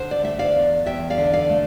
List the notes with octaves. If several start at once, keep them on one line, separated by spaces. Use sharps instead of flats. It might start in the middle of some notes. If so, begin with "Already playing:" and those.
Already playing: D3 C5
D5
A3 E5
D5 F5
E2
E2 E5 G5
D5 F5
D3
D5 F5
A3